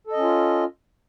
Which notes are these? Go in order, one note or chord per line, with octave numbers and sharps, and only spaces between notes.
C#4 F4 A4 D#5